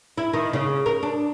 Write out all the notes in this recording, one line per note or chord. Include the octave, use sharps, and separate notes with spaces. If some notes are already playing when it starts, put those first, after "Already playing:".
E4
D#3
C#3
A#4
D4